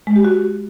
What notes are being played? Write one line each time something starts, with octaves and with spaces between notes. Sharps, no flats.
G#3
G4
F#4